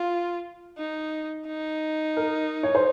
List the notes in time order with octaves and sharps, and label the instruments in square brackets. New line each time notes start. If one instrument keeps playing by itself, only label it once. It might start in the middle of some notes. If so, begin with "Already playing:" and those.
Already playing: [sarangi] F4
D#4
D#4
[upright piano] A#4
C#5
C5